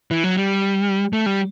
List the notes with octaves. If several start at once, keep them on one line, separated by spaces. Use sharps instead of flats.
E3
F#3
G3
A3
G3